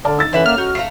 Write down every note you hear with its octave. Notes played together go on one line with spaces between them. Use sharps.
D3 D5 A5 F6
D#4 E6 A6
D3 E3 C#4 A4 E5 F#5
A#3 F6
D#4 F#4
A3 F5 A#5 C7